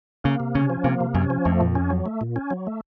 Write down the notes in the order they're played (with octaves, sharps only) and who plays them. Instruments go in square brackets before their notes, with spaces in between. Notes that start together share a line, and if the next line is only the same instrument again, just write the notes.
[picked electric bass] C#3 [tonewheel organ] A#3
[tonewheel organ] C3
[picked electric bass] C#3 [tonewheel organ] C#4
[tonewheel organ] F3
[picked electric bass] C3 [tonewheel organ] A#3
[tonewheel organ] C3
[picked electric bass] F#2 [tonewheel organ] C#4
[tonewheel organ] F3
[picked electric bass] F2 [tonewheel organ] A3
[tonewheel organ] A#2
C#4
F#3
A3
A#2
C#4
F#3
A3